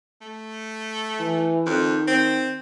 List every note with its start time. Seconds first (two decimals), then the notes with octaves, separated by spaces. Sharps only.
0.21 A3
1.20 E3
1.67 F2 D#3
2.08 C4